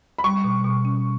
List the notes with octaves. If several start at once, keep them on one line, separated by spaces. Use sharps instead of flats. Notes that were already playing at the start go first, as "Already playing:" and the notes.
B5
G3 C#6
B2
B2
C#4